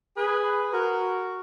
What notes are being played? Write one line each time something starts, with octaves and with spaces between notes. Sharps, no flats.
G#4 B4
F#4 A#4